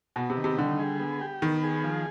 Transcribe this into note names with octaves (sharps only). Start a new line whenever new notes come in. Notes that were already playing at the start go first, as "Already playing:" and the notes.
B2 B3
C3
D#3
C3
D3 G3
G#4
B3
G4
D#3 B3
G#4
F3